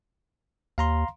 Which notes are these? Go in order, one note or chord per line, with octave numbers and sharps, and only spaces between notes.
D#2 F5 A#5 C6